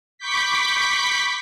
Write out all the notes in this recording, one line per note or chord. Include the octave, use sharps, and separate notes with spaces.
B5 C#6 D6 G6 B6